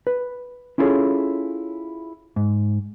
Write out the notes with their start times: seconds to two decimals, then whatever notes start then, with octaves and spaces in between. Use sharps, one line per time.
0.07 B4
0.78 C#4 E4 F4 G#4 A4 C#5
2.36 G#2